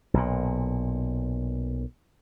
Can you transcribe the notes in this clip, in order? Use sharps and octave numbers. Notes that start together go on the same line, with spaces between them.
B1 A#2